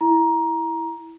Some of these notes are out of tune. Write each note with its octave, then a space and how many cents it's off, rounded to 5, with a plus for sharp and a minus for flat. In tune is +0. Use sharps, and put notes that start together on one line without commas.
E4 +0 A#5 +15